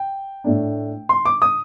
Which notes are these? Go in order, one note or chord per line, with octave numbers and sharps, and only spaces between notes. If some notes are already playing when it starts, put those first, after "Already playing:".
Already playing: G5
A2 A3 D4
C6
D6
D#6